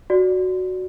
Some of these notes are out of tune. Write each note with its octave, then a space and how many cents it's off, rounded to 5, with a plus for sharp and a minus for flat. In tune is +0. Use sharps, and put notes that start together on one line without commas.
F#4 +0 D5 +0